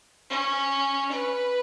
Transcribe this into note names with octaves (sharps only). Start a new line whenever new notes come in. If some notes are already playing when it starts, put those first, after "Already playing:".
C#4
B4